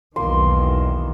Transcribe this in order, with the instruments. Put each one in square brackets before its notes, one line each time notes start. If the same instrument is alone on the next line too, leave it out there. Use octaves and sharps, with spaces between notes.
[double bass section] B1 E2 D#3 [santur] A#3 C6